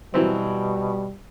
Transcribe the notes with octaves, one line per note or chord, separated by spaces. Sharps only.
B2 E3 F#3 G3 C4